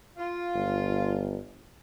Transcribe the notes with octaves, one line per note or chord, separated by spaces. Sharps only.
F4
G1